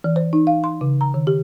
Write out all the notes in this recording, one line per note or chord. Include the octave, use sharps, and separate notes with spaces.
E3
C5
D#4
F5
C6
C#3
A#5
D#3
G4